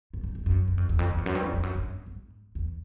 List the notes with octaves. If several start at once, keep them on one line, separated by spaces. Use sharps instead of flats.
G2
G2
G2
F#2
F#2
F2
E2
F2
F2
E2
F#2
G2
F2
F2
F#2
G2
G#2
E2